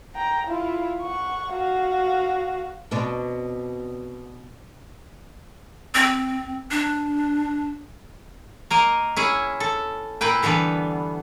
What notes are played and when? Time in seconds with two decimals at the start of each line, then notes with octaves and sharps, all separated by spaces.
0.15 G5 A#5
0.47 E4 F4
1.02 F#5 C#6
1.53 F#4 F5
2.91 B2 C4 D4
5.95 C4
6.71 D4
8.70 A#3 A#4 D#5
9.17 C#4 E4 G#4
9.60 A4
10.21 A#2 E4 B4 G5
10.43 D3 E3 G3 B3